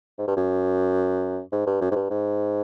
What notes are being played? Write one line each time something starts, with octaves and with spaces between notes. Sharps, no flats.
G#2
G2
F#2
G#2
G2
F#2
G#2
G2
G#2